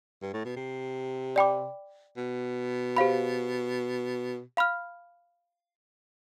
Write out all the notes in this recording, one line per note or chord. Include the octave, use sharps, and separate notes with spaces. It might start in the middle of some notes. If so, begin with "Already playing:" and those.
G2
A2
B2
C3
D5 G5 B5 D6
B2
G4 C5 F5 B5
F5 B5 F6